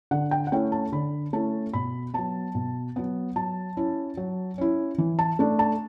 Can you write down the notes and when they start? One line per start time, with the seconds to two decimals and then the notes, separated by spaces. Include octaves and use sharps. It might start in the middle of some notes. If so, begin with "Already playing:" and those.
0.11 D3 F#5
0.31 G5
0.47 F#5
0.52 A3 C#4 E4 G5
0.72 A5
0.92 D3 B5
1.33 A3 C#4 E4 A5
1.73 B2 B5
2.14 F#3 B3 A5
2.55 B2
2.96 F#3 B3
3.36 F#3 A5
3.77 C#4 E4
4.17 F#3
4.58 C#4 E4
4.98 E3
5.19 A5
5.39 A3 D4
5.59 A5